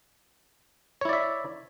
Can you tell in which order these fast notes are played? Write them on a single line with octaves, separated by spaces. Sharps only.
C#5 E4 D5 E5